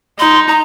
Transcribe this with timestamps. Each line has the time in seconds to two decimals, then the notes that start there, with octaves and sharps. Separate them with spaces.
0.19 D#4 C6
0.48 A#5